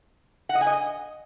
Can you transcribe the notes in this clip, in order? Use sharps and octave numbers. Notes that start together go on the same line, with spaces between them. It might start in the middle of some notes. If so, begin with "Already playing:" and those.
F#5
D#5
G#5
D#5